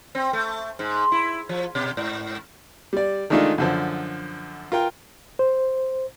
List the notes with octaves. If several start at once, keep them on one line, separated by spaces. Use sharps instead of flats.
C4
A3
G#2
E4
F3
B2
G#2
G3 D5
D#3 G#3 A3 D4 D#4 F4
F#2 D3 F3
F4 A#4 G5
C5